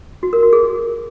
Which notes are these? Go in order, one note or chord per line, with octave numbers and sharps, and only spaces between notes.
F#4
A#4
F#4
G#4